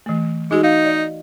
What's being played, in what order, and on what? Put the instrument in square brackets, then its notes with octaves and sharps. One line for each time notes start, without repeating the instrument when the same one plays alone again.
[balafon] E3 A3
[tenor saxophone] G#3 [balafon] D#4 F#4
[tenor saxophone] D#4 [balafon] F5
[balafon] D5 D#5